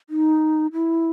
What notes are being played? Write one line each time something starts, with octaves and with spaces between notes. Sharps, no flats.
D#4
E4